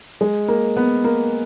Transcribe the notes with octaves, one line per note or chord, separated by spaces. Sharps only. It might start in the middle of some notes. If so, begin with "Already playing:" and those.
G#3
A#3
B3
A#3